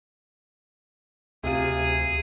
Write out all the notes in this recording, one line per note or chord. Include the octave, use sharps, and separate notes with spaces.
D2 C3 F4 G#4 D#7